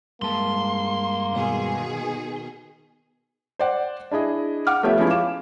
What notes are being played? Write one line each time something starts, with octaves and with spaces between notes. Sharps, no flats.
G2 G#3 A#3 A5 C6
B2 D#3 G#4
C5 D5 F#5
D4 E4 G#4 D#5
F#5 D6 F6
F3 A3 B3 G4 C#5 E5
F3 G#3 B3 C#4 E4 F4
F5 D6 E7